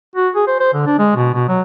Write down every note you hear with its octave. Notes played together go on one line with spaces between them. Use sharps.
F#4
G#4
C5
C5
D3
D4
G#3
B2
B2
F#3